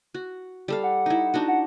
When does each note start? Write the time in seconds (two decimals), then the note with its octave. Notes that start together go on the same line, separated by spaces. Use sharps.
0.14 F#4
0.68 G3 A4 F5
0.83 F#5
1.06 D#4 E4
1.34 D4 D#4 F#4
1.48 F#5